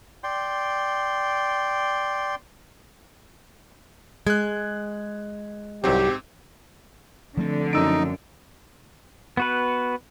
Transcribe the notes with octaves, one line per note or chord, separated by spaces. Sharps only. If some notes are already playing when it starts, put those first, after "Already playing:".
D5 G5 C6
G#3 F#6 G#6
C2 G#2 F#3 C4 G4
D3 F3 A3 C4
F#2 D#4 E6 D7
B3 F#4 B4